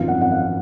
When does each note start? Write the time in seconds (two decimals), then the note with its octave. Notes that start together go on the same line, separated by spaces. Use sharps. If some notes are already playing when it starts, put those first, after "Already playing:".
Already playing: G#1 F#2 F3 B3 F5
0.08 F#5
0.22 F#5
0.32 F5